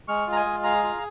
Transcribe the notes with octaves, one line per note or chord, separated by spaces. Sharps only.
G#3 C#6 F6
F4
A#5
D#5 G#5
G#3
G#4 F5 A#5
F4